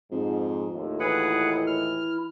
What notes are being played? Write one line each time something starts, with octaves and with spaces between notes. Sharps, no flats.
F2 G#2
D#2 A2 F4
E3 E4 G#4 B4 F#5
F6